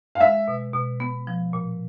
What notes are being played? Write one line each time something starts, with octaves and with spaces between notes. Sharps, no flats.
F5
G#3 E5
B2
B2
B3
F3
A#2